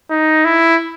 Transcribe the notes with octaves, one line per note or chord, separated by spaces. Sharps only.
D#4
E4